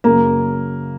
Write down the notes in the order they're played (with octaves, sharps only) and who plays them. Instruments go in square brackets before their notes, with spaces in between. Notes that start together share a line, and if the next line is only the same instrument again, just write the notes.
[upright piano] F#2 C#3 F#3 [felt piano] A#3